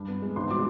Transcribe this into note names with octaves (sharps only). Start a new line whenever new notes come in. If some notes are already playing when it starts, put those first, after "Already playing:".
Already playing: G2
B3
G#3
G#1 C6
F#3 D6